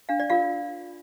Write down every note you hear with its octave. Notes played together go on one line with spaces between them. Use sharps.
D4 F5
D5
F4 A#4 F5